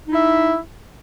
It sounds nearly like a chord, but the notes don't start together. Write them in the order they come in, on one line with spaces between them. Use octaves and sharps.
D#4 E4 E5